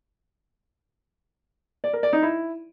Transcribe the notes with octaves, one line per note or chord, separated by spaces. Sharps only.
D5
A#4
D5
D#4
E4